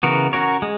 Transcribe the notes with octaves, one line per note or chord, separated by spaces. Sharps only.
C#3 E3 B3 F#4 A#4
C#4 F#4 A#4 C#5
G#3